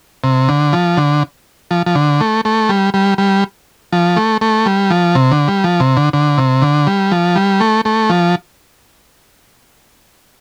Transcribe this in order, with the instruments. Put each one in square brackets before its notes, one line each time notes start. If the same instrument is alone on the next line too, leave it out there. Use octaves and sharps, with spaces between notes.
[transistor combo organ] C3
D3
F3
D3
F3
F3
D3
A3
A3
G3
G3
G3
F3
A3
A3
G3
F3
C3
D3
G3
F3
C3
D3
D3
C3
D3
G3
F3
G3
A3
A3
F3